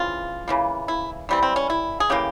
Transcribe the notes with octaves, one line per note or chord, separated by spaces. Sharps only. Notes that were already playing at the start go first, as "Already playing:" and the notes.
Already playing: C#3 E3 C4 F4
C#3 E3 A#3
E4
E3 G3 C4
C4
C#4
E4
G#4
C#3 E3 A#3 G4